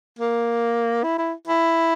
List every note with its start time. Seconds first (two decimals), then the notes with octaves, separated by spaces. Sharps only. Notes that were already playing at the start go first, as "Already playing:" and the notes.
0.19 A#3
1.03 E4
1.18 E4
1.47 E4